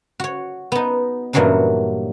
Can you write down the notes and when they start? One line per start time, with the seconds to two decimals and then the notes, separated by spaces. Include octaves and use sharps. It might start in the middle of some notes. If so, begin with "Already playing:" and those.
0.20 F#4 C#5
0.72 B3 D#4
1.33 G2 A#2 E3 F#3 D4 D#4